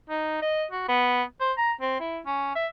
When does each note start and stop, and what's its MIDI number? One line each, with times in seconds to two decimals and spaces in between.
0.09 0.42 63
0.42 0.65 75
0.71 0.86 66
0.89 1.23 59
1.41 1.53 72
1.58 1.73 82
1.81 1.98 60
2.00 2.20 64
2.26 2.51 61
2.56 2.67 76